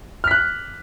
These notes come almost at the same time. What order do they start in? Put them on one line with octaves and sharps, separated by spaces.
F6 B6 F#6